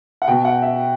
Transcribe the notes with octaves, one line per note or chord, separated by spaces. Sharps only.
F#5
B2 G5
F#5
E5